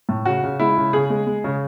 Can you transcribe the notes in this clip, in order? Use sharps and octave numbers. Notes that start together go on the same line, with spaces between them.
A2
C#3 F#4
C#3
G#3 E4
C#3
C#3 G#4
G#3
G#3
C#3